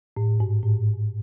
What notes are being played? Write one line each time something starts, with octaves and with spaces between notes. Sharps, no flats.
A2
G#2
A2